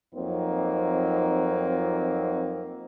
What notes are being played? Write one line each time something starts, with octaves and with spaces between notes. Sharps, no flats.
F2 F#3 A#3 C4 D#4